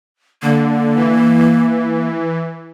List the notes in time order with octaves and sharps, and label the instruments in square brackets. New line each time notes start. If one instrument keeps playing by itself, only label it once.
[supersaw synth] D3 [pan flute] A#3
[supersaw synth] E3